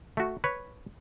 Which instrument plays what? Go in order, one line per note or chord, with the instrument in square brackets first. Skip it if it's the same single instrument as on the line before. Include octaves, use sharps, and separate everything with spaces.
[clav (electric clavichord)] A3 F#4
B4 C#5